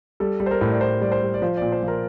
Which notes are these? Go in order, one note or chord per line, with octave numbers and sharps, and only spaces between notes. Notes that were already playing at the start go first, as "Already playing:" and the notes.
G3 A4
G3
C5
A#4
A2
D5
A2 C5
G3 D5
C5
G3
D5
F3 C5
A#2 D5
C5
F3
A#4